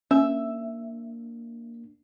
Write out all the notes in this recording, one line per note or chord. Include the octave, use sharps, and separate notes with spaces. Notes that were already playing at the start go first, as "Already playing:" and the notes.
A#3 C#4 D4 E5